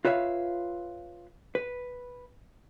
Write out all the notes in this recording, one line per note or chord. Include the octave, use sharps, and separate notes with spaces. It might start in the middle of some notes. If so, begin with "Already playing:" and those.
F4 B4 C#5 E5 F5
B4